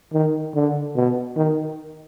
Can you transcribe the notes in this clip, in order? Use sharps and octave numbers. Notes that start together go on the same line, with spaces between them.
D#3
D3
B2
D#3